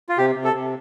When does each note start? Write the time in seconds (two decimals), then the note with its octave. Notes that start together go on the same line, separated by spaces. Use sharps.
0.09 F4
0.18 C3 G4
0.35 C3
0.44 A4
0.53 C3